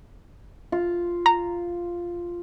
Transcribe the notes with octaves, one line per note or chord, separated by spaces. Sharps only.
F4
A#5